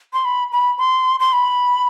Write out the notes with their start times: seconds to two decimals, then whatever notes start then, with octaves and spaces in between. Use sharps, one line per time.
0.13 C6
0.25 B5
0.52 B5
0.78 C6
1.20 C6
1.33 B5